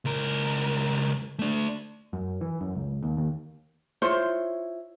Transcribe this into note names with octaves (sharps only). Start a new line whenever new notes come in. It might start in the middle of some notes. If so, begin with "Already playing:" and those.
C#2 A#4
A3 D4
F#2
E3
F#2
C#2
D#2
D#2
E4 F4 C5 C#5